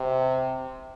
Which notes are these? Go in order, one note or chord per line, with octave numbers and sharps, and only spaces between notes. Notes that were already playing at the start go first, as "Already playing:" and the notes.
Already playing: C3